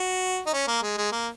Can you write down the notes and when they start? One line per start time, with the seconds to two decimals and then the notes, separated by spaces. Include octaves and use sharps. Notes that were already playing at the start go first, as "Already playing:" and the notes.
Already playing: F#4
0.47 D#4
0.53 C#4
0.68 A#3
0.83 G#3
0.97 G#3
1.12 A#3